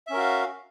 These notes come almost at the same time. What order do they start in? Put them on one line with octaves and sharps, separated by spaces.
E5 C#4 A#4 F#4 F5